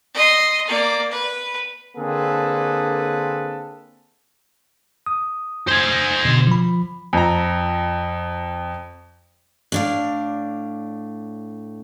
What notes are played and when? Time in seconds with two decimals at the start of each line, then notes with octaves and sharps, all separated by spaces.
0.14 D#5 C6
0.68 A#3 D5
1.11 B4
1.97 D3 A#3 C4 G#4 A4 B4
5.06 D#6
5.68 C5 G#5
6.25 B2 D3
6.47 F3 B5
7.13 F2 A#5
9.72 A2 D4 F5